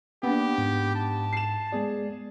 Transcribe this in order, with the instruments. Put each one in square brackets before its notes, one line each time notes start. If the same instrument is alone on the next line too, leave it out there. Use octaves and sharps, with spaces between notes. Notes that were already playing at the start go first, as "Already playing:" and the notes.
[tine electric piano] A#3 [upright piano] B3 D4 [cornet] G4
[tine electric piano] G#2
[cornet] A5
[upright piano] C7 E7
[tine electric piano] G#3 B3 D5 [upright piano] G#4